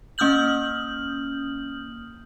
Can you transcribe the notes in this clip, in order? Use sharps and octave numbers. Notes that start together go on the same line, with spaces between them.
A#3 C#4 D#6 F6 G6 F#7